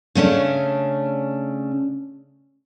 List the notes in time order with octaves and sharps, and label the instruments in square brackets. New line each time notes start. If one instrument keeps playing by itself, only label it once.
[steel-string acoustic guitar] C#3 A3 C#4 D4